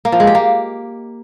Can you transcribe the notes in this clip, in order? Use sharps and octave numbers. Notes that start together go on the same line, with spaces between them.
A#3
F3
G#3
G4
A#3